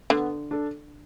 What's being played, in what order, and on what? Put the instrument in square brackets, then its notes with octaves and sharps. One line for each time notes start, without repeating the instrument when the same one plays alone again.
[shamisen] D3 [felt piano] B3
[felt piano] D4 A4